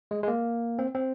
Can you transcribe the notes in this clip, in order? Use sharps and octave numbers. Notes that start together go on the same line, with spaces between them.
G#3
G#3
A#3
C4
C4